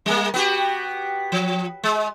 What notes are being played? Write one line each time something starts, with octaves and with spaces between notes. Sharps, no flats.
G3 A#3
B3 F#4 G4
F3
G#3